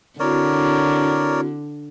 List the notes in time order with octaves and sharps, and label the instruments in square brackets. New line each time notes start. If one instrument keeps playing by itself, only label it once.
[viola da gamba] D3 [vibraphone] C4 E4 F#4 [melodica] A#4 C#5 D5